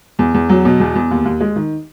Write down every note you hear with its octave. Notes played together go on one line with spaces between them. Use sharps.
E2
E2
F#3
B2
E2
E2
D#2
D#2
G#3
D#3